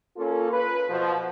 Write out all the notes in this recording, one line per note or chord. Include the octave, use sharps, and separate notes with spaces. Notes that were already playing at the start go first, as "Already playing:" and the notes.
A#3 C#4 F4 A4
B4
B2 F3